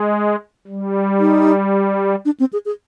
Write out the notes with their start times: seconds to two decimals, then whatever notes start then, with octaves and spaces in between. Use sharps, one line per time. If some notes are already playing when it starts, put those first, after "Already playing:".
Already playing: G#3
0.67 G3
1.20 D#4
2.25 D4
2.40 C4
2.53 G#4
2.65 G#4